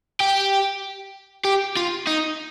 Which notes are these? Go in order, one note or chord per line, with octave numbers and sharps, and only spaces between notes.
G4
G4
F4
D#4